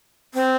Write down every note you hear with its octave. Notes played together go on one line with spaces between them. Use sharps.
C4